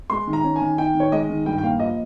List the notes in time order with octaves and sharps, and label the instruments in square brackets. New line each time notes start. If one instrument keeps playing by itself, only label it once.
[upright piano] G#3 C6
D#3
A#5
C#4
G#5
D#3
D#4 G5
D#3
C#5
G#3 D#5
D#3
G2 G5
G5
A#3 F5
F3 D#5